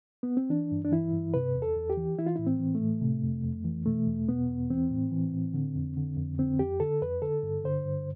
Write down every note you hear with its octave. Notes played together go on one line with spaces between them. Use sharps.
B3
C4
E3 D4
G2
D4
E3 E4
G2
C3 B4
E2
A4
E2
G4
E3
E3 E4
F4
A2 E4
C4
E3
A3
A2
C3
F2
F2
E3
B2 A3
E2
B2 B3
E2
E3 C4
A2
E3
A2
D3
F2
D3
F2
D3 C4
F2 G4
D3 A4
F2 B4
D3 A4
G2
D3 C5
G2